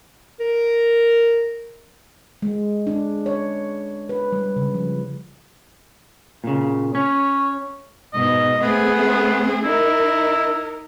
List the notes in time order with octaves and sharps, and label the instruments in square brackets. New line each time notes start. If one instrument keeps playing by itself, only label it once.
[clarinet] A#4
[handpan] G#3
D4
C#5
B4
G3
C#3
F3
[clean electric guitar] A#2 C#3
[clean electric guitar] C#4 [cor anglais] C#5
[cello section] G#2 B2 [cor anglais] D#5
[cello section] A3 C4 G#4 [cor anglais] B3
[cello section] D#4 A#4 [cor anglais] E4